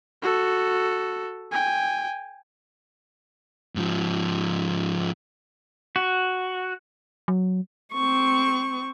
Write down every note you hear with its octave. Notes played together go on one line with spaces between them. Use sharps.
F#4 A4
G5 G#5
G#2 F3
F#4
F#3
C4 C#6